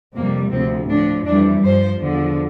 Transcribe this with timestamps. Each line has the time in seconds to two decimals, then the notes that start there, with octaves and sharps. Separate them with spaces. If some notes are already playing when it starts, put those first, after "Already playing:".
0.15 F2 C3 G3 A#3
0.51 D2 C3 F3 C4
0.89 A2 F3 D4
1.25 F2 E3 G3 D4
1.63 G2 F3 C5
2.00 E2 D3 F3